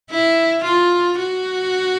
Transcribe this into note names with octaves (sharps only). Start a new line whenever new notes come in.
E4
F4
F#4